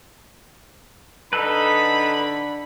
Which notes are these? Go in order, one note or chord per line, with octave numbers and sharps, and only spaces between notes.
D3 D#4 A4 B4 B5